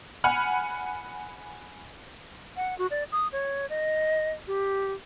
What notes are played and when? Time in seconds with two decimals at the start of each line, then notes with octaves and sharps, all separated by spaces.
0.24 F#5 G#5 B5 F6
2.57 F#5
2.79 F#4
2.91 D5
3.12 D#6
3.32 C#5
3.70 D#5
4.47 G4